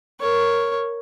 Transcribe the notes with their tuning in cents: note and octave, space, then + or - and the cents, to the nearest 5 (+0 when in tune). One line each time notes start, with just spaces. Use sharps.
A#4 +0 C#5 +0